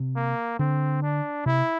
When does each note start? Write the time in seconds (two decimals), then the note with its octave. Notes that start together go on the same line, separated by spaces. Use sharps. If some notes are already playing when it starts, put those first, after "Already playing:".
Already playing: C3
0.16 A#3
0.59 D3 C4
1.03 D4
1.46 C3 E4